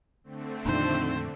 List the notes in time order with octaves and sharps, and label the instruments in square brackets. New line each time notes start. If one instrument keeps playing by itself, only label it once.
[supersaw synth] D3 A3 C4
[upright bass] F2 A#2 [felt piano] D#3 D4 [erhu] C5